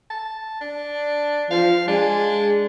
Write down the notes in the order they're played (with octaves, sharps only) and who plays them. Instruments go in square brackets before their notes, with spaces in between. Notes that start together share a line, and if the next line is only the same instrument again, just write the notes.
[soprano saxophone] A5
D4
[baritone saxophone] F3 [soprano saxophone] F5
[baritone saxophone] G#3 [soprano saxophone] D4